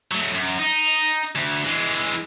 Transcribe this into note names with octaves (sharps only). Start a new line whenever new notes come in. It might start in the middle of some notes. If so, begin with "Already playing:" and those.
F#3 A3
F#2
D#4
D2
E3 G#3